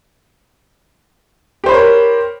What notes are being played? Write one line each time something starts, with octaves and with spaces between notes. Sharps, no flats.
G4 A#4 C5 C#5 B5